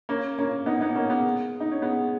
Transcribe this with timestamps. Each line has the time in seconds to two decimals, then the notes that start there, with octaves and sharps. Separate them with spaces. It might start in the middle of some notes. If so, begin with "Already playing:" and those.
0.09 A#3 C#4
0.39 A#3 C#4
0.66 B3 D#4
0.81 B3 D#4
0.95 A#3 C#4
1.09 G#3 B3
1.60 D#4
1.72 C#4
1.82 G#3 B3